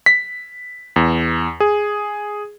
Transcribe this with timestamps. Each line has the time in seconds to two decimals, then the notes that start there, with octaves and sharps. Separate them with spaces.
0.06 B6
0.96 E2
1.60 G#4